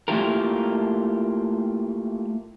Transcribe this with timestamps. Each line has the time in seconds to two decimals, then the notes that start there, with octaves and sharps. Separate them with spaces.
0.08 A3 A#3 E4 F4 G4 A#4